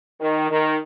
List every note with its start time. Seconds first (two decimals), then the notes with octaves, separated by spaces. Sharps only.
0.21 D#3
0.50 D#3